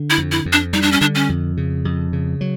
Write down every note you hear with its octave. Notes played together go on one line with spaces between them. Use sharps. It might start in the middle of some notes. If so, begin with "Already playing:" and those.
Already playing: D3
E4
F2
E4
F2
D4
G3 D#4
D4
C#4
D3 D4
C#4
F2
C#3
F2
C#3
F#3